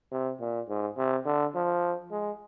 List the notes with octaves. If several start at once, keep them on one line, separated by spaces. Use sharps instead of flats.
C3
A#2
G#2
C3
D3
F3
G#3